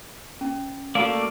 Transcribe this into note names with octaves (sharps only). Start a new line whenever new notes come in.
C#4
A3 A#3 F#4 D5 F5